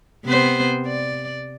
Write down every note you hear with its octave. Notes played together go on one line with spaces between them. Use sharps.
C3 B3 C5
D5